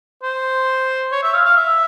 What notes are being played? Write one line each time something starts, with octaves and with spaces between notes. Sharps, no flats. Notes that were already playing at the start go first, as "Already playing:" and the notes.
C5
C#5
E5
F5
F5
E5